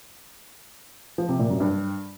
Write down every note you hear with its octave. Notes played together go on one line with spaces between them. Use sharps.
F3
C3
A#2
F#2
G2